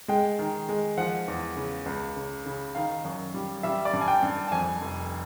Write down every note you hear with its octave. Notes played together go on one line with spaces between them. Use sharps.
G#3 G5
D#3
G#3
F3 F#5
E2
C#3
C#2
C#3
C#3
D#3 F5
F#2
G3
G3 E5
D5
G2
G#5
G5
G2
A5
F2 G#5
F1